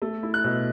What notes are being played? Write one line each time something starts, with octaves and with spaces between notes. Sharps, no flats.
A3
E4
F#6
B2